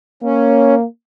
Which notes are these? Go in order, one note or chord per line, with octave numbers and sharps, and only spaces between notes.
A#3 C#4